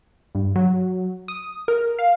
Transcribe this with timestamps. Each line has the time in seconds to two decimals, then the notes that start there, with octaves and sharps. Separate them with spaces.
0.35 G2
0.56 F#3
1.28 D#6
1.68 A#4
1.99 F5